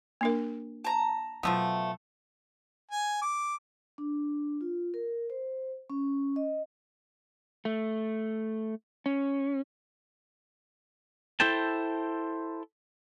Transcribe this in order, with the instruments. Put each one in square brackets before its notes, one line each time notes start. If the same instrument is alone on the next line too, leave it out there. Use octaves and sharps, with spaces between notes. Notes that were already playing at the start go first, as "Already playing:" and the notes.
[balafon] A#3 D4 A#4
[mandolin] A5 A#5
[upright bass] B2 F#3 [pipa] F3 A3 B3
[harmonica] G#5
D6
[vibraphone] D4
F4
A#4
C5
C#4
D#5
[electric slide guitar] A3
C#4
[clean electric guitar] E4 A4 C5 G5 A5